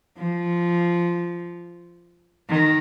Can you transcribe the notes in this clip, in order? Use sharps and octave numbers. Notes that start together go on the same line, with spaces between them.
F3
D#3